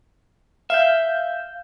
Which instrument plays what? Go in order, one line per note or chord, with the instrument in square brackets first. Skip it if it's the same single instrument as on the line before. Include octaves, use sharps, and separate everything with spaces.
[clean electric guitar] E5 [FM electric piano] F5 G6